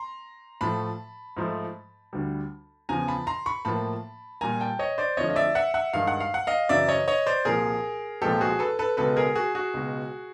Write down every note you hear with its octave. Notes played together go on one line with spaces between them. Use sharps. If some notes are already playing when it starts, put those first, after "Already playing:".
Already playing: A#5 C6
A2 F3 A3 A5 B5
G#2 F3 A3
D2 D3 G3
E2 C#3 F3 G#5 A#5
A5 B5
A#5 C6
B5 C#6
A2 F3 A#3 A5 B5
A#2 G3 A#3 G#5 A#5
G5 A5
C#5 D#5
C5 D5
F2 D3 F3 A3 C#5 D#5
D#5
D5 E5
E5 F#5
E5 F#5
G2 D#3 G#3 F5
F#5
F5
F#5
D#5 F5
F#2 C#3 E3 D5 E5
C#5 D#5
C#5 D#5
C5 D5
C2 A#2 F3 G#4 A#4
C2 A#2 F3 G#3 B3 G4 A4
F#4 G#4
A4 B4
A4 B4
C#2 B2 G#3 B3 A4 B4
G#4 A#4
F#4 G#4
F#4 G#4
C#2 B2 G#3